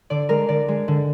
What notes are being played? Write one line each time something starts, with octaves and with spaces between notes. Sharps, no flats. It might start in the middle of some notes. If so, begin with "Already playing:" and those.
D3 D5
G#3 A#4
D3 D5
G#3
D3